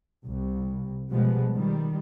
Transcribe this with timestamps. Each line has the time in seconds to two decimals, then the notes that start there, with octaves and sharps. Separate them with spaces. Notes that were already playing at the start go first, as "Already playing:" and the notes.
0.25 C2
1.11 B2 F3 G3 G#3 B3
1.55 D#3 G3